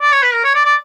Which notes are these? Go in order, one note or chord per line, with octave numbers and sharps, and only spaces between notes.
D5
C#5
B4
A#4
C#5
D5
D5